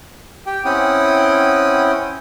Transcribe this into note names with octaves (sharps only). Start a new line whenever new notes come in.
G4 G5
C4 C#4 E4 F#5 G5 D#6